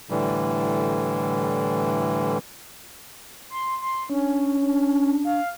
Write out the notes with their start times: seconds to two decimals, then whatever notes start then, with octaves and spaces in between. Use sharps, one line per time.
0.10 A2 D3 E3 G3
3.50 C6
3.82 C6
4.10 C#4 D4
4.61 D4
5.25 F5